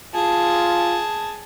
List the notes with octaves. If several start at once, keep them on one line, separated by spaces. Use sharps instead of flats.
F4 G#4 A5